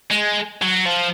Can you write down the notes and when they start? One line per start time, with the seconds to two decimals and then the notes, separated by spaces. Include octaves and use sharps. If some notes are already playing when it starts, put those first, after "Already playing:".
0.11 G#3
0.62 F#3
0.86 F3